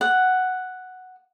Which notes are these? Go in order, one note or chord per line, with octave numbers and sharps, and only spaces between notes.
F#5